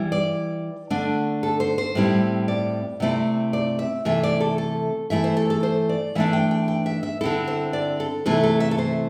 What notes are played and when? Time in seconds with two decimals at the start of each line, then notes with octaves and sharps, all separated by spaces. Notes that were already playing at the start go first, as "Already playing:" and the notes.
Already playing: E3 G3 E4
0.12 D5
0.90 D3 A3 D4
1.43 A4
1.60 C5
1.78 C5
1.95 A2 G3 C4 E4
2.48 D5
3.00 C3 A3 C4 E4
3.53 D5
3.79 E5
4.05 C3 E3 A3 E5
4.23 D5
4.40 A4
4.58 A4
5.10 E3 A3 E4 E5
5.24 C5
5.37 A4
5.50 A4
5.63 C5
5.89 D5
6.15 E3 A3 D4 E5
6.33 G5
6.51 G5
6.68 G5
6.86 E5
7.03 E5
7.21 D3 C4 E4 A4
7.47 C5
7.73 D5
8.00 A4
8.26 C3 E3 A3 C4 E4 A4
8.43 A4
8.60 E5
8.71 A4
8.78 C5